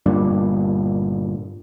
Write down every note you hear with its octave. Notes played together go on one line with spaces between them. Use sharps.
G1 G2 A#2 D4